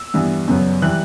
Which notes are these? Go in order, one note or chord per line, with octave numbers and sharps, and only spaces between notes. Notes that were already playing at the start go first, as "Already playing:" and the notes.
Already playing: E6
G2 E3 B3
F#2 C#3 F#3 B3
E3 G3 F#6